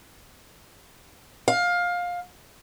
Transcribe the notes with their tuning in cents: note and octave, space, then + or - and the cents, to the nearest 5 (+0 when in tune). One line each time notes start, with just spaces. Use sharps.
F5 +20